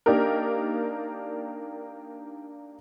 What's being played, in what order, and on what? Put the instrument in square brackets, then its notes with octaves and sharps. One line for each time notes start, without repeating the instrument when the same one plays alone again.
[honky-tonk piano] A#3 D4 D#4 G4 A#4